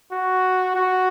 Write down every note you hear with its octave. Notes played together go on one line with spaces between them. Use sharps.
F#4
F#4